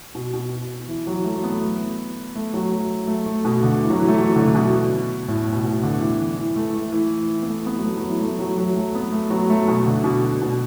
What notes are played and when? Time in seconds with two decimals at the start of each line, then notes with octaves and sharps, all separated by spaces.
0.15 B2
0.34 B2
0.88 E3
1.07 F#3
1.24 A3
1.36 A3
1.44 B3
2.36 A3
2.54 F#3
3.08 A3
3.26 A3
3.45 B2
3.63 D3
3.82 E3
3.90 F#3
4.00 E3
4.08 A3
4.18 F#3
4.36 D3
4.48 D3
4.55 B2
5.28 A2
5.52 B2
5.65 B2
5.84 D3
6.01 E3
6.20 E3
6.38 E3
6.56 A3
6.75 A3
6.92 E3
7.42 B3
7.48 A3
7.66 B3
7.76 F#3
7.84 A3
7.97 F#3
8.09 E3
8.21 A3
8.39 F#3
8.58 F#3
8.77 A3
8.95 B3
9.12 A3
9.30 F#3
9.50 A3
9.68 B2
9.86 D3
10.04 B2
10.41 B2